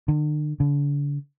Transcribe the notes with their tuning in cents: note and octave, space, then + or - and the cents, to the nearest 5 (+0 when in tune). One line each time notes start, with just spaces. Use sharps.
D3 +45
D3 -40